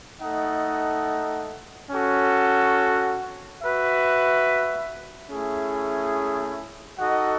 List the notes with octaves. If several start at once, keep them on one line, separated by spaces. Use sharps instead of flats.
A3 D#4 A4 D#5 F#5
C#4 F#4 A4
F#4 B4 E5
A3 C#4 E4 G#4
D#4 F#4 A4 D#5 F#5